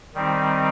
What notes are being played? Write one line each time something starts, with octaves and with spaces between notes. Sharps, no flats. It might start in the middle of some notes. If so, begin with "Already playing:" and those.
D#3 G3 C4 D#4